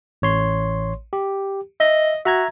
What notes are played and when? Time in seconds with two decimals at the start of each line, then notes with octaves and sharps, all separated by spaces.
0.22 A1 C#5 C6
1.13 G4
1.80 D#5 E5
2.25 F#4 E5 A#5 G#6